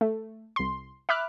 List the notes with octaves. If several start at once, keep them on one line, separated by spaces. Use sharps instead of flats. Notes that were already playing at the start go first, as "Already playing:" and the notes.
A3
C2 C6
E5 B5 D6 F6 F#6